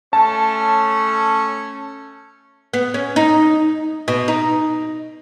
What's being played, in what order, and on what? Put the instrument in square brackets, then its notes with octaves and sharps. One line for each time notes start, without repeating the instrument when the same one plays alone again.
[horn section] A3 C#4 [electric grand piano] A5
[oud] B3
C#4
D#4
B2
D#4